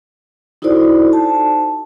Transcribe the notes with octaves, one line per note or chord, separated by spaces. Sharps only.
D#4 E4 F#4 A4 C5 D5
A5